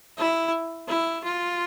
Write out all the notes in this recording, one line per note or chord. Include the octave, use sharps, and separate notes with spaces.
E4
E4
F4